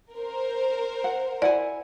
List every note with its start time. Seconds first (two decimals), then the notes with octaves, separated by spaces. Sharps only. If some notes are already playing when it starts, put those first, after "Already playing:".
0.16 A#4 C5
1.04 F#5
1.42 E4 D5 F#5 G#5